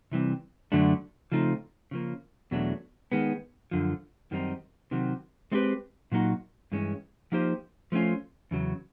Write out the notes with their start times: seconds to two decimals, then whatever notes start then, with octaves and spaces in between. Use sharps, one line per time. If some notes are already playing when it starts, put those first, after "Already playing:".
0.11 C3 E3 G3 C4
0.72 F#2 D3 F#3 A3 D4
1.32 C#3 F3 A3 C4 D#4
1.91 C#3 F3 A#3
2.51 E2 B2 F#3 A3 D4
3.12 D#3 G#3 B3
3.71 F#2 D3 F3
4.31 F#2 D#3 G3 C4 D#4
4.91 C3 D#3 F#3
5.52 G#3 C4 D#4 G4 B4
6.12 A#2 F#3 A#3 D#4 F#4
6.72 G2 E3 G#3 C#4
7.32 F3 A#3 D#4 G4 C5
7.92 F3 A3 C#4 F4
8.51 E2 C#3 F#3